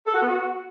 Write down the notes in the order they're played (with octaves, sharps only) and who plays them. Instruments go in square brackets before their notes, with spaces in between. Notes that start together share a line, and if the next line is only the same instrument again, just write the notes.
[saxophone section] A4
F#4
B3
F#4